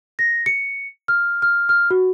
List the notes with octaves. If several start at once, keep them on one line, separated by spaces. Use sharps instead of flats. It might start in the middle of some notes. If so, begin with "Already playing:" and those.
A#6
C#7
F6
F6
F6
F#4